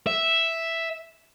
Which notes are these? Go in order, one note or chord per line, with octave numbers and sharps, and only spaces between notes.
E5